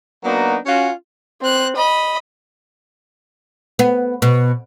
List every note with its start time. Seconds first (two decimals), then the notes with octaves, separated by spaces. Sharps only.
0.24 F#3 A#3 B3 D4 D#4 F#4
0.66 C#4 F4 F#4
1.41 C4 F#6
1.76 D#5 B5
3.79 B3
4.22 B2